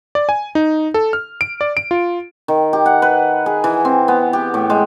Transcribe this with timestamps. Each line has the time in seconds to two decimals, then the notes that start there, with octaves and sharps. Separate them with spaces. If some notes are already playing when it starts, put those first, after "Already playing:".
0.15 D5
0.29 G#5
0.55 D#4
0.94 A4
1.13 F6
1.41 D7
1.61 D5
1.77 D7
1.91 F4
2.48 D#3
2.73 G4
2.86 F#5
3.02 B4
3.46 G#4
3.64 E3
3.85 C4
4.08 B3
4.33 G4
4.54 A2
4.70 G#3